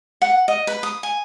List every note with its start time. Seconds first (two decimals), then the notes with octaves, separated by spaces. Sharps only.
0.22 F#5
0.48 D#5
0.67 B4
0.83 D#6
1.03 G#5